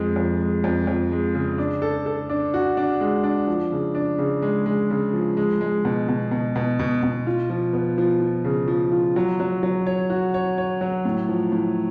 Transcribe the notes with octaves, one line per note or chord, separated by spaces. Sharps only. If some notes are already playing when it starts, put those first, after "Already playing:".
Already playing: F2 G#3
F2
G#3
F2
F2
G#3
C#3
D4
A4
A4
D4
F#4
D4
G#3
D4
F3
C#3
D4
C#3
G#3
G#3
C#3
F3
G#3
G#3
B2
B2
B2
B2
B2
B2
F4
F3
B3
F3
F3
C#3
F3
F4
F#3
F#3
F#3
C#5
F#4
C#5
C#5
F#3
A2
F3
A2